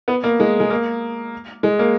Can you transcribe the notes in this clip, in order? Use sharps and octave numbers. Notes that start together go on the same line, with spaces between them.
B3
A#3
G#3
G#3
A#3
G#3
A#3